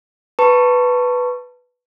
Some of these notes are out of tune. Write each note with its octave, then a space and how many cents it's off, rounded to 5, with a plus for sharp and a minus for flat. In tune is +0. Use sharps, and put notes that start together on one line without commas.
B4 +0 A5 +20 C#6 +0